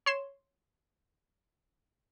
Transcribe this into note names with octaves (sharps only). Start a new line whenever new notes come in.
C#5 C6 E7